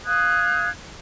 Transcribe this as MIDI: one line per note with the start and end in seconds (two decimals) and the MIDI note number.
0.05 0.70 77
0.05 0.70 87
0.05 0.70 90
0.05 0.70 92